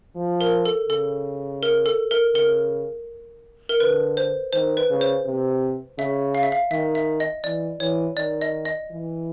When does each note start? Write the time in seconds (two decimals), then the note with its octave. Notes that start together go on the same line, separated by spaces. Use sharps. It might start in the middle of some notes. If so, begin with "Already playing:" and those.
0.16 F3
0.41 A#4
0.65 A4
0.89 C#3 A4
1.63 A#4
1.86 A4
2.11 A#4
2.34 C#3 A#4
3.69 A#4
3.80 D3 B4
4.17 C5
4.53 D#3 C5
4.77 B4
4.90 C#3
5.01 C5
5.25 C3
5.98 C#3 E5
6.35 F5
6.43 E5
6.52 F5
6.71 D#3 E5
6.95 E5
7.20 D#5
7.44 E3 D5
7.80 E3 C#5
8.17 D#3 D5
8.42 D#5
8.65 D#5
8.91 E3